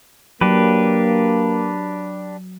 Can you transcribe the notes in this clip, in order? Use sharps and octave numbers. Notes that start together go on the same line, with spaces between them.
F#3 A#3 D4 G4 B4